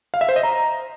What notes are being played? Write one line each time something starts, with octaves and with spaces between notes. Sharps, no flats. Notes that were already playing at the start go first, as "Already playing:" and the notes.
F5
E5
C5
D#5
A#5